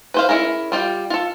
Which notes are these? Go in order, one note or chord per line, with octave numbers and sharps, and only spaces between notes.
B4 C5 F5
C#4 E4 G#4 A#4
G3 F4 G5
F4 A4